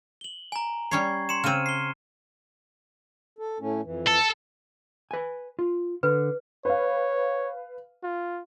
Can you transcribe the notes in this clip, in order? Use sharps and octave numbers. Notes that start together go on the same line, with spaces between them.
F#7 G7
G#5 A#5
G3 C#4 C#5 C#6 G#6 C7
C6 C#7 E7
C#3 C4 F6 D#7
C7 G7
A4
A2 A3 C#4
F2 E3
A4
B4 G#5
F4
D3 B4
B4 C#5 F5
F4